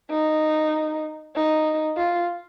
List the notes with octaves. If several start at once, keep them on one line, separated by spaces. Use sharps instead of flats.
D#4
D#4
F4